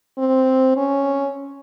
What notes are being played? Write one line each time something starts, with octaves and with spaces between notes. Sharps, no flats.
C4
C#4